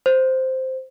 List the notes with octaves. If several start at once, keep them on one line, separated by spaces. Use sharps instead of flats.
C5